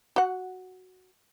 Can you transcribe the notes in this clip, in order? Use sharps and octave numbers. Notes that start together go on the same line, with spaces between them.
F#4 F#5